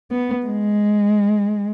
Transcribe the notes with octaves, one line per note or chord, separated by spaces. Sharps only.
B3
G#3